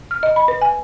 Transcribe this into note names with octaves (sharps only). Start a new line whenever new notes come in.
F6
D#5
B5
B4
G#5